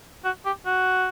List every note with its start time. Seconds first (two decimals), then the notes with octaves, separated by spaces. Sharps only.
0.24 F#4
0.45 G4
0.66 F#4